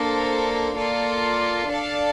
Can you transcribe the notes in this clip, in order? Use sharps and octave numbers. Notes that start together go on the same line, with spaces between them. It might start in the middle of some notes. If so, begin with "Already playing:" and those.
Already playing: A#3 D4 A4 C5
A#3 F4 A4 D5
D4 A4 D5 F5 A5